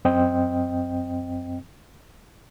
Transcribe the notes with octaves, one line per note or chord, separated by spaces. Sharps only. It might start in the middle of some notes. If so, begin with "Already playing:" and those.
F#2 C4 D#5 G5